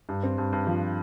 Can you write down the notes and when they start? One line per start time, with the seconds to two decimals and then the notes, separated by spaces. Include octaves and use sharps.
0.09 G2
0.23 C4
0.38 G2
0.53 G2
0.67 F3